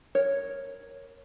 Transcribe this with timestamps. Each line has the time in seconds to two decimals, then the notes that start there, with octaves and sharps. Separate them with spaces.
0.15 A#4 C#5